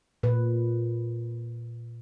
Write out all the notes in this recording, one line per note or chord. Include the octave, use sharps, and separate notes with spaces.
A#2 B4